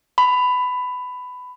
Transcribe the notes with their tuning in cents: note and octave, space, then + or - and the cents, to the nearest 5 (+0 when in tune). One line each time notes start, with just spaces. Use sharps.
B5 +15